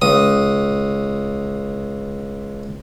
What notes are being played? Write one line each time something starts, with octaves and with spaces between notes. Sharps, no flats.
C#2 D#6